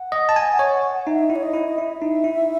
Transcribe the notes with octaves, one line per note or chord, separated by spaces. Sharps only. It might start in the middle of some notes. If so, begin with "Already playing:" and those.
Already playing: F#5
D#5
A5
G#5
C#5
D#4 E5
E4
C#5
D#5
E4
D#5
E4 E5
D#4
E4